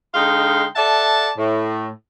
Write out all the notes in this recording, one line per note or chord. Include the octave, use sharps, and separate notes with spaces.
D3 G#3 D#4 F5 G5 C6
A4 D5 E5 F#5 A5
A2